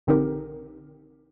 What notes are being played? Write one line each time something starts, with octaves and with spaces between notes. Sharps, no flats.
A#1 D3 C4 D#4 G4 A#4